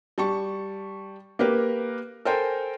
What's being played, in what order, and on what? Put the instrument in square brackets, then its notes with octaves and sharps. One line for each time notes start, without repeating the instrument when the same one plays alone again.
[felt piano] G3 A5 C#6
A#3 G4 A#4 B4
A4 A#4 C5 G5 G#5